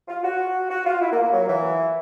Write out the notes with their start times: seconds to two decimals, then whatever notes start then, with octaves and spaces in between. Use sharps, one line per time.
0.08 F4
0.23 F#4
0.70 F#4
0.85 F4
1.02 E4
1.11 A#3
1.22 A#3
1.32 F#3
1.48 E3